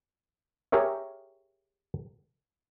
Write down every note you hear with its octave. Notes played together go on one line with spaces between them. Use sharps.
G4 G#4 A#4 C#5 E5